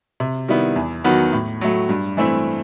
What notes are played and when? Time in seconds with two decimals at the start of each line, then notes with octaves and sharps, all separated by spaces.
0.20 C3
0.48 D#3 G3 B3 E4
0.76 E2
1.04 D#3 F#3 B3 F#4
1.33 A2
1.61 F#3 A3
1.89 G2
2.17 E3 A3 C4 E4